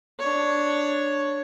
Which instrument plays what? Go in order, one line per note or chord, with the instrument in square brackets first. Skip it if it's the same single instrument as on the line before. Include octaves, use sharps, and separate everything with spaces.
[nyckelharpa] D4 C#5